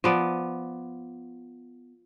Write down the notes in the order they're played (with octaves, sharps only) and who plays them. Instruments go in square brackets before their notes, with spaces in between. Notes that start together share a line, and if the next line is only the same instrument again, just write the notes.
[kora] F3 B3 D5